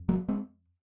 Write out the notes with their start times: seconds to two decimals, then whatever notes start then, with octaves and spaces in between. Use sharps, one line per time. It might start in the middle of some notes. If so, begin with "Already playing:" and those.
Already playing: F2
0.09 F#3 A#3
0.28 G#3 C4